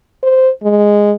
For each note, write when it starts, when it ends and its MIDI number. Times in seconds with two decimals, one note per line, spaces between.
0.23 0.50 72
0.63 1.13 56